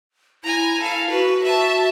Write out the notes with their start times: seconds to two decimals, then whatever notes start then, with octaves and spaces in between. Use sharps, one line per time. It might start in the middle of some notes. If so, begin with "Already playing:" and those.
0.44 E4 G#5 A#5
0.81 A4 F5
1.10 F#4 B4
1.44 E5 A5